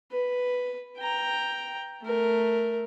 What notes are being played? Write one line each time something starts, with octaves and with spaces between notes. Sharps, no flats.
B4
G5 A#5
A3 A#4